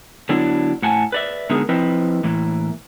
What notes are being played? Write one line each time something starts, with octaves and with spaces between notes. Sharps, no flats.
D3 F#3 B3 D4 E4
A2 F#5 G#5 A5
B4 D5 E5
D3 G#3 B3 D#4 G#4 A#4
F3 C4 E4 B4 D#5
A2 E3 A#3